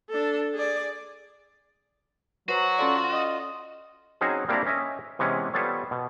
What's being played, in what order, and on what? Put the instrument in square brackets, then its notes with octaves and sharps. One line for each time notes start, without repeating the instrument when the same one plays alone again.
[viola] D4 A4
G#4 D5
[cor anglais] F#3 [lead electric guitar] F#4 [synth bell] B4 C5 A#5
[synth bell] C#4 A4 D5 [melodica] F4
[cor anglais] D#5
[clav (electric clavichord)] F#3 C4 C#4 D#4 F#4 G#4
G3 A#3 C4 D4 E4 A#5
C#4 D#5 E5
C3 E3 G#3 B3 C#4
G3 B3 F4 A4 C#5
B2